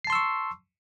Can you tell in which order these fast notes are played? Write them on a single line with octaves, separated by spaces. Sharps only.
C7 A5 C6 E6 C#6